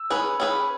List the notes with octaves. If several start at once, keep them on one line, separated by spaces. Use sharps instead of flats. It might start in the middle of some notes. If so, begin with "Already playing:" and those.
Already playing: E6
C#4 G#4 B4
C#4 G#4 B4